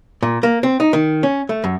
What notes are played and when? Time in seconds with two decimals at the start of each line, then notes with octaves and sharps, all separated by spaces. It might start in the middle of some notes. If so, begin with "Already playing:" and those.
0.23 A#2
0.43 A#3
0.63 C4
0.80 D#4
0.93 D#3
1.23 C#4
1.49 A3
1.64 F#2